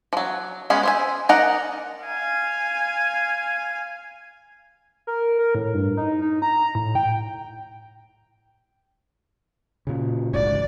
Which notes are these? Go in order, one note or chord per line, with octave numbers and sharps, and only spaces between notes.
F3 F#3
G#3 B3 C#4 G#4
C5 E5 G#5
D#4 A#4 D5 F#5 A#5
F5 G#5
A#4
A#4
A2
G2
D#4
D#4
A#5
A2
G5
A#2 C#3
D1 A1 G#2 D5